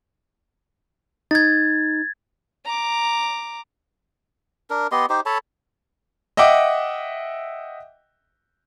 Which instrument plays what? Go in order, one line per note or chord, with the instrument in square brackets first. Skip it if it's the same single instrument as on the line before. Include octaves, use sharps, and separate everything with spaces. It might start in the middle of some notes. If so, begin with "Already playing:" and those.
[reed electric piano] D#4 [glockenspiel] G#6 A6
[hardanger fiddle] A#5 D6
[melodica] D4 A#4
B3 G4 D#5 C6
D#4 G4 C5
A4 C#5 A5 B5
[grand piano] D#5 E5 F#5 G5 D6